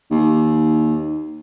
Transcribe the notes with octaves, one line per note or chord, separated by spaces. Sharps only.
D#2